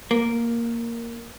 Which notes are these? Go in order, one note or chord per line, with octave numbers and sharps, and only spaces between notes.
A#3